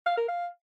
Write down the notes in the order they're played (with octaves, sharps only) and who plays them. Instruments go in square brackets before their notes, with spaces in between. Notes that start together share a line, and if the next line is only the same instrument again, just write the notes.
[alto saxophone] F5
A#4
F5